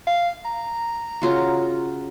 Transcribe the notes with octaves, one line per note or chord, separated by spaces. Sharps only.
F5
A#5
C#3 F4 F#4